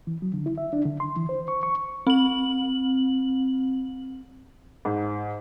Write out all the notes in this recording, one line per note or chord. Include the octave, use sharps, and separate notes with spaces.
E3
F#3
D3
E4
E5
D4
D3
C6
E3
C5
C#6
C#6
C4 F#7
G#2